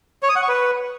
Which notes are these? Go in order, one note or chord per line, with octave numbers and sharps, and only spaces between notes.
C#5
D#6
F#5
C#6
B4